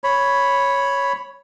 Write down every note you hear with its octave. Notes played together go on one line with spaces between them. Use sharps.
C#5 B5